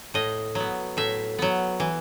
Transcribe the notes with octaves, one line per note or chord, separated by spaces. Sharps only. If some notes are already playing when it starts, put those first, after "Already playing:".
A2 D#5
F#3 B3
A2 E5
F#3 B3
E3